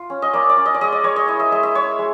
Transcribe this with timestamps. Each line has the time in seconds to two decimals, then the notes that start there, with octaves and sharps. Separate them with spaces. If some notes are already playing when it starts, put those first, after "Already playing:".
Already playing: F4
0.10 C#4
0.22 D#5
0.33 A#3 D5
0.49 D5
0.57 C#4
0.66 D#5
0.74 D5
0.81 G#3 D#5
0.92 D5
1.04 G#3 C#5
1.16 D#5
1.27 E4 D#5
1.40 E5
1.51 G#3 D#5
1.63 E5
1.75 G#3 C#5
1.99 G#3